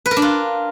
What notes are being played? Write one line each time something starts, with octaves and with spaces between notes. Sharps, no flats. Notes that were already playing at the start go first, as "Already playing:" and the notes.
B4
A#4
D4
F4